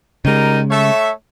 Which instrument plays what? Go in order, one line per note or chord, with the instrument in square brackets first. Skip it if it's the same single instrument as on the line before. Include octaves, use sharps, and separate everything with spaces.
[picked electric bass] C#3 G#3 [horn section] G3 D#4 A#4
[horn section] A3 C#5 E5